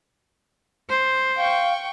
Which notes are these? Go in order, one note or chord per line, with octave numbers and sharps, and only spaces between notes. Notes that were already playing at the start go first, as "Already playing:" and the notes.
C5
F5 G5 C#6